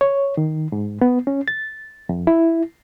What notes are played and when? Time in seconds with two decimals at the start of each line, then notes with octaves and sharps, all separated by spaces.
0.01 C#5
0.37 D#3
0.72 G#2
1.01 B3
1.27 C#4
1.48 A6
2.09 F2
2.27 E4